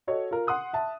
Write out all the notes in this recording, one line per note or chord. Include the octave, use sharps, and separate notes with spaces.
F#4 A4 C#5 D#5
F4 A#4
F#5 C6 D#6 F#6
E5 A5